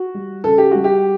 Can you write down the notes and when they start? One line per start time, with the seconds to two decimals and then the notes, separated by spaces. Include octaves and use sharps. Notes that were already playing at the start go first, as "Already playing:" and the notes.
Already playing: F#4
0.14 G3
0.44 C#3 A4
0.58 G4
0.71 G3 F#4
0.84 G4